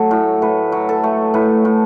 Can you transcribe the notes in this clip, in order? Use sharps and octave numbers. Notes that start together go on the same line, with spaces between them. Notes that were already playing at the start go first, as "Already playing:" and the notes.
Already playing: F#3 A3 A4
A2
A2 B4
F#3
A4
A3
A2 B4
A2